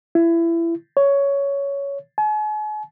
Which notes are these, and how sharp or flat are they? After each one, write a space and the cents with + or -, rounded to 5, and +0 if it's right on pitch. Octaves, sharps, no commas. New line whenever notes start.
E4 +25
C#5 +10
G#5 +45